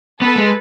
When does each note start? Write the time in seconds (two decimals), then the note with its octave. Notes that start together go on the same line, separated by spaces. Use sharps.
0.22 B3 A4 B4
0.38 G#3